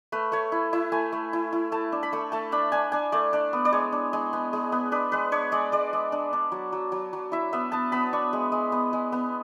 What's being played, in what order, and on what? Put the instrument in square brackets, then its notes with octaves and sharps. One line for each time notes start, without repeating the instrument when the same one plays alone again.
[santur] A3 B4
A3 C#5
E4
E4 E5
A3 G#5
A3
E4
E4
A3 A5
D4
B5
A3 C#6
A3 A5
D4 B5
D4 G#5
D4 G#5
A3 D5
D4 D5
B3
D5
G#3 C#5
D4
G#3
B3
G#3
B3
D4 B4
G#3 B4
D4 C#5
G#3 D5
G#3 D5
G#3
D4
D4
F#3
F#3
F#3
F#3
E4 E5
B3 E5
B3 A5
B3 B5
D4 C#6
G#3
G#3
B3
G#3
B3